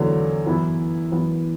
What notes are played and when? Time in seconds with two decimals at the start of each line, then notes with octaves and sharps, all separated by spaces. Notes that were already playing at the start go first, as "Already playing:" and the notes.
Already playing: E2 D3 F#3 A3
0.45 F#2 E3 B3 E4
1.12 F#2 E3 B3 E4